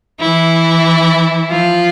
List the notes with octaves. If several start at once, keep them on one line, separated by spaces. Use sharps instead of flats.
E3 E4
F3 F4